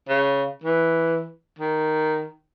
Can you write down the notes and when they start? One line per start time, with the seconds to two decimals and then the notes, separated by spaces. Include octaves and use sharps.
0.09 C#3
0.64 E3
1.59 D#3